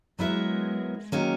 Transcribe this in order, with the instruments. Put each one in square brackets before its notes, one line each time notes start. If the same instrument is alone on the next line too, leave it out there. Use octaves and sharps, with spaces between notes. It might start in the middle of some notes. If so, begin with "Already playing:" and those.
[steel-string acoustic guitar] F#3 B3 E4 A#4 E5 [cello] G#3
[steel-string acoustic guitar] D#3 F#3 A#3 C#4